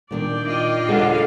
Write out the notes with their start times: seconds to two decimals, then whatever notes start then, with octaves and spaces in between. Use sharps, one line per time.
0.11 A#2 D#3 D4 D5 G5
0.46 F4 D#5
0.89 D#2 G#3 D4 G#4 A4 F5 F#5